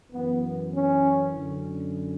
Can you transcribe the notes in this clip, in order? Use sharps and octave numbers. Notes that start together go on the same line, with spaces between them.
F#2 E3 B3
C#4
F#2 D3